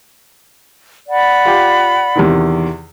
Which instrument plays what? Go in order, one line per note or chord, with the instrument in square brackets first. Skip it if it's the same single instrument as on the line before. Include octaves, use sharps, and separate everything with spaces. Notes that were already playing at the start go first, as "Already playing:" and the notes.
[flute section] D5 F#5 B5
[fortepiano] F4 G4
E2 C3 D#3